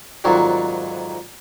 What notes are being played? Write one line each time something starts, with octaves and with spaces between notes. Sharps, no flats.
F2 G#2 D#3 F#3 G3